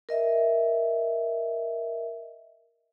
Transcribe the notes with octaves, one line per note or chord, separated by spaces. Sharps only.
A#4 D#5 E5